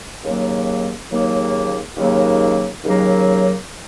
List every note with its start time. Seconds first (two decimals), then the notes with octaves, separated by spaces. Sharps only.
0.24 D#2 C#3 F#3 A#3
1.10 D#2 C#3 F#3 A#3
1.98 D#2 C#3 F#3 A#3
2.84 D#2 C#3 F#3 A#3